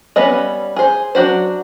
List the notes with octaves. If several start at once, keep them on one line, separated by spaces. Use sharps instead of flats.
G3 B3 C#4 B4 D#5
G#4 C5
F#3 D4 F#4 C5